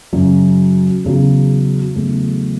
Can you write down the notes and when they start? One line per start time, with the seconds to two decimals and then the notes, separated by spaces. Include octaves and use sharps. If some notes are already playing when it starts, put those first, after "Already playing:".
0.13 F#2 C#3 F#3
1.04 E2 C#3 F#3
1.96 E2 C#3 F#3 A3